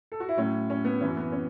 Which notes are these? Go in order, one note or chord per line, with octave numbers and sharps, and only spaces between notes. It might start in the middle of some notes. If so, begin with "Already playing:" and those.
A4
F#4
E4
A2 F#3 C#4
C#4
B3
F#2 E3 C#4
B3
C#4